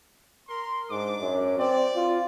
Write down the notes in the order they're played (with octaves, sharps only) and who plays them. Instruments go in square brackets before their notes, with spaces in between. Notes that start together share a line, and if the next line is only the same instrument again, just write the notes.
[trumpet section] A#4 C6
[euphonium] G#2 [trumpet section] D4 D6
[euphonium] F#2
[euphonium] C4 [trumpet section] D5
[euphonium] F4